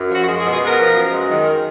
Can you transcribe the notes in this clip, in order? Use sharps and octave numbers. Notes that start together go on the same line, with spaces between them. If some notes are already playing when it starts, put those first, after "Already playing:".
Already playing: F#2
F3 F#4
F#4
G#3 G#4
G#4
B2
G#4
B3
A#4
F3
F#2
G#3
D#3